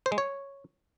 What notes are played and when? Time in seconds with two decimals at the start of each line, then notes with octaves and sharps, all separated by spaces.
0.06 C5
0.12 G#3
0.18 C#5